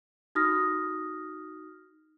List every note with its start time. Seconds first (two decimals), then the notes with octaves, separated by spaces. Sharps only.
0.35 D#4 F#4 D#6 F6 A#6